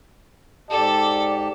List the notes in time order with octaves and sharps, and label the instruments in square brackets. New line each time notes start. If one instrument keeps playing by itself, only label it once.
[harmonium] G#2 G4 A5 [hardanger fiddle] A4 [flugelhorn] D5